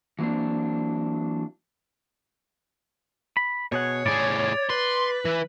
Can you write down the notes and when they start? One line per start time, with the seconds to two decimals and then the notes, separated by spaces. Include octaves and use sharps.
0.19 E3 F#3 A#3 C4 D4
3.37 B5
3.72 B2 G#4 C#5 F#5
4.06 A2 G#4 D5
4.70 B4 C6
5.26 E3